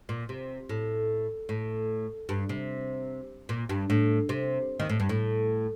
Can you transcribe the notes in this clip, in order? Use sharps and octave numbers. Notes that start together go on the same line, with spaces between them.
A#2
C3
A2
A2
G2
C3
A#2
G2
A2
C3
D#2 D#3
A2
G2
A2